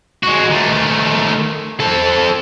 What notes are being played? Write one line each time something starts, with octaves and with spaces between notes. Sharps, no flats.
G#3 F#4
D#3 A3
C4 A4